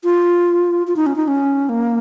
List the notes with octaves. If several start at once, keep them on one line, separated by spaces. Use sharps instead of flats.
F4
F4
D#4
C#4
D#4
C#4
A#3